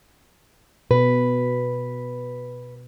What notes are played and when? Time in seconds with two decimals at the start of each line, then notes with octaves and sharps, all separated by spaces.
0.91 B2 B4